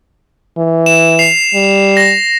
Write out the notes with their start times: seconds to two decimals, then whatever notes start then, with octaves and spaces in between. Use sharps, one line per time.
0.58 E3
0.86 E7
1.19 C7 F7
1.54 G3
1.97 A#6